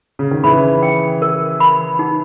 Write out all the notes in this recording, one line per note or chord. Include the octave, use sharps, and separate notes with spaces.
C#3
D#3
C#3 E3 B5
G5
A#4
B5
D#4